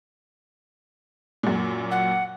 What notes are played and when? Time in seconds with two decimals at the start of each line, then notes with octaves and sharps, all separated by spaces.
1.43 F#2 A#2
1.91 F#5